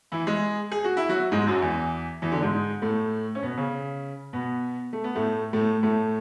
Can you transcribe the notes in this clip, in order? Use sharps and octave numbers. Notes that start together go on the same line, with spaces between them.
E3 E4
G#3 G#4
G#4
F#4
E4
F#3 F#4
G#2 G#3
F#2 F#3
E2 E3
E2 E3
D3
G#2 G#3
A2 A3
C#4
B2 B3
C#3 C#4
B2 B3
A3
B3
A2 A3
A2 A3
A2 A3